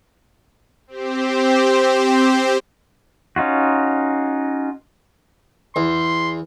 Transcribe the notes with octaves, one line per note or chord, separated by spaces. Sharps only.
C4 G4 C5
C#4 D#4 F4 F#4
E2 C6